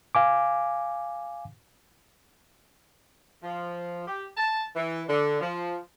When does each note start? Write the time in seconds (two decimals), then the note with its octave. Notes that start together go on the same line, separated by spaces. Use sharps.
0.15 F5 G#5 D6
3.42 F3
4.07 G4
4.36 A5
4.76 E3
5.08 D3
5.41 F3